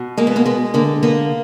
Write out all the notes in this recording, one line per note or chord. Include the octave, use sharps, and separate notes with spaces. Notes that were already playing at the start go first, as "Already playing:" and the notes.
Already playing: B2
G#3 A#3
B3
A#3
G#3 B3
D3 A#3
A#3 B3